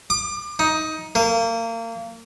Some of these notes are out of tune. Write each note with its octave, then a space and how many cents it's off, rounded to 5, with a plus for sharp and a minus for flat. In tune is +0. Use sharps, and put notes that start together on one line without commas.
D6 +30
D#4 +15
A#3 -30